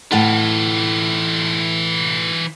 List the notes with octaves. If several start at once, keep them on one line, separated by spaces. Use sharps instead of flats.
A2 E3 F4 F#5 A5